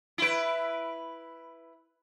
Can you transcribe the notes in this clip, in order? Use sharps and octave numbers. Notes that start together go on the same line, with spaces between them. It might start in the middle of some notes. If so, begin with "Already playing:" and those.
E4 B4